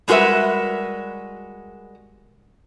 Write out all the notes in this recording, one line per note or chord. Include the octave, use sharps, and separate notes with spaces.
G3 G#3 F#4 A#4 B4 E5